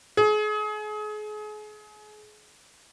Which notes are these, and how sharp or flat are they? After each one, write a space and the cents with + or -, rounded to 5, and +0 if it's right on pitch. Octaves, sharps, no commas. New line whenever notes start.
G#4 +35